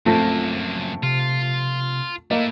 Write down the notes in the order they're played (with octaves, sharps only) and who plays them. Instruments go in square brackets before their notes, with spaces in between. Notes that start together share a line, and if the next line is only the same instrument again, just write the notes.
[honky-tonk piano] A#1 C4 A#6 [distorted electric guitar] F#2 A#3 [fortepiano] A3
[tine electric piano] C3 [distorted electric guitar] F4
[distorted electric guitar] A3 E4 [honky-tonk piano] A#3 [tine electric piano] D#5